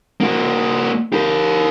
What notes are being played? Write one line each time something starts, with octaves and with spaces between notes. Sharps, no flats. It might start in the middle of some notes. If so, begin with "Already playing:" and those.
A#3 F#4
G4 A#4